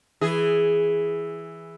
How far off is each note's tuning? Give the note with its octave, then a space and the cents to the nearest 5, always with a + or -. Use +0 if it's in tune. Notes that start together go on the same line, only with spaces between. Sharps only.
E3 +0 G#4 +0